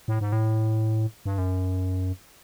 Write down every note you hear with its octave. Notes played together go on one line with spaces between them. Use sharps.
A2
G#2
A2
G2
F#2